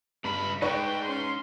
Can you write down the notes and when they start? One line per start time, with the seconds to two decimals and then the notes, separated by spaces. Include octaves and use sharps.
0.24 C#2 G2 B5
0.62 G#3 D#4 B4 D5 G5 C#6
1.05 C#4 C6